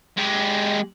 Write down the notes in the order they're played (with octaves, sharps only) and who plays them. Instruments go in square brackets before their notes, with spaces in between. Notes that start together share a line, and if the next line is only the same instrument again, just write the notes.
[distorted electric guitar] G#3 G4